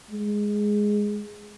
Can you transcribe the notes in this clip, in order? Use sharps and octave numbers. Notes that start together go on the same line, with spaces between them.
G#3